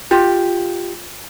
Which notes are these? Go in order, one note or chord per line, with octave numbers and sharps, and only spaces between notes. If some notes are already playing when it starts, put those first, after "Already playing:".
F4 G4